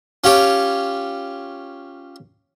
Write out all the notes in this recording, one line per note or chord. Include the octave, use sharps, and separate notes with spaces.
C#4 F4 G4 C#5